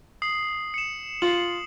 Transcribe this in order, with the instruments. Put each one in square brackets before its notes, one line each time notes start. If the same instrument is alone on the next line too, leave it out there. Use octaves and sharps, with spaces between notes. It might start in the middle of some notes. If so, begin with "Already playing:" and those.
[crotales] D#6 C7 F#7
C#7 E7
[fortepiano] F4 [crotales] F#7